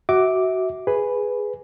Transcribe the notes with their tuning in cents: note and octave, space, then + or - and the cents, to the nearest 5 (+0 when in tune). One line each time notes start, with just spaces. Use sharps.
F#4 +15 E5 -25 D6 +0
G#4 +0 B4 +0